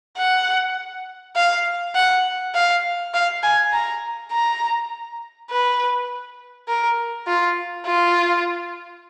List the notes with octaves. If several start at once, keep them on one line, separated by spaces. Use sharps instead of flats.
F#5
F5
F#5
F5
F5
G#5
A#5
A#5
B4
A#4
F4
F4